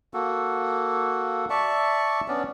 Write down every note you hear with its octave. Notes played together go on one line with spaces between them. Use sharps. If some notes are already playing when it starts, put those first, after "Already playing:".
A#3 F#4 A4
D5 E5 A5 C#6
B3 C#4 D4 D5